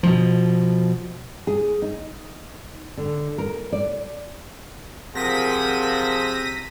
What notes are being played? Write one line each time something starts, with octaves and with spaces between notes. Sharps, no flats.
B2 F3
G#4
D#4
D3
A#4
D5
C3 F3 G#4 A#4 F#5 A#6 B6 D#7